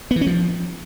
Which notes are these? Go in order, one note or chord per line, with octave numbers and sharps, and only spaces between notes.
B3
E3
C#4
F3